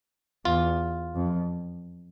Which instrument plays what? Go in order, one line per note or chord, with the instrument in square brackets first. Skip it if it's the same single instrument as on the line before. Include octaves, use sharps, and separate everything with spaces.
[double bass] E2 [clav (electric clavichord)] F4
[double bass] F2